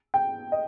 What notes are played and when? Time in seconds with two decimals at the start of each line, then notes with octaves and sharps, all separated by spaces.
0.14 G5
0.52 D#5